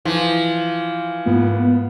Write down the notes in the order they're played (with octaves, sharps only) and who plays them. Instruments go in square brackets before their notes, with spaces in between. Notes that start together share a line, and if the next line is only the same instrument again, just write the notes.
[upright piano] E3 [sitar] F3 [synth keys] F5 C6
[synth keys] G#2 A#3 F4 [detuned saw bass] B3